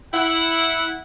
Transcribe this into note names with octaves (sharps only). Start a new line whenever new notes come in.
E4 F#5